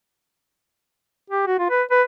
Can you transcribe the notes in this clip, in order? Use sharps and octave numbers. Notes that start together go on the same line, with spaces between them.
G4
F#4
F4
B4
B4